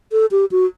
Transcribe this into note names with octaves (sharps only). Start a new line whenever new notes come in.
A4
G4
F#4